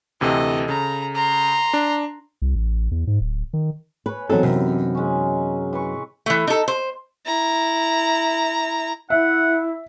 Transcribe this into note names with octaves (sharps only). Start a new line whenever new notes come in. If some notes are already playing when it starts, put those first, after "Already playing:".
D2 C3 E3 A4 D#5
C#3 A#5
A#5 C6
D4
C2
A1
E2
G#2
D1
D#3
B4 C#5 G#5
E3 F#3 B3 C4 D#4 E4 A4
F#2 C3
G#3 C#4
E3 B4 C#6
E3 A3
D#4 A4
C5
E4 A#5
E4 E5 F#5